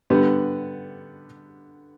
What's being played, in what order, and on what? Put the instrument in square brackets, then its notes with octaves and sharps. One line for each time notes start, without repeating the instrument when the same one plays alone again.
[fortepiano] D3 G3 B3